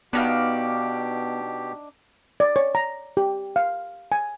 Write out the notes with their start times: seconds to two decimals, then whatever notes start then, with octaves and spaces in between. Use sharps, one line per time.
0.13 B2 B3 D4 D#4 G4 F5
2.40 D5
2.56 C#5
2.75 A#5
3.17 G4
3.56 F5
4.12 G#5